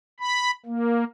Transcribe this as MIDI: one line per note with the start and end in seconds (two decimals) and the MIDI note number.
0.20 0.51 83
0.66 1.04 58